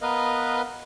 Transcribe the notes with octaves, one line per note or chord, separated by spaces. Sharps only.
B3 A#4 B4 D#5 F5